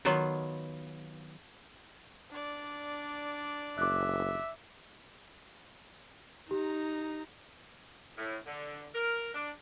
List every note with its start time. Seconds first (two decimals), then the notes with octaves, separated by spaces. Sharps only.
0.05 D#3 F#3 B3 F4
2.30 D4 D5
3.78 F#1 E5 D6 F#6
6.51 D#4 G4 A#5
8.18 A2
8.47 D3
8.95 A#4
9.34 D4